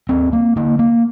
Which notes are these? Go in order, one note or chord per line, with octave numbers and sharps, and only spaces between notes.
D#2 C4
A#3
D3 A#3
A#3